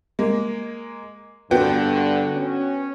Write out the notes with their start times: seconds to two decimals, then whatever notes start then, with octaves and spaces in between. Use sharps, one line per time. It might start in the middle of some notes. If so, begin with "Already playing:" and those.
0.19 G#3 A#3
1.51 G2 D3 B3 F#4 G5
2.36 C#4